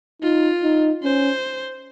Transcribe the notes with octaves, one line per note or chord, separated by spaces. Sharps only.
D#4 F4
D#4
C#4 C5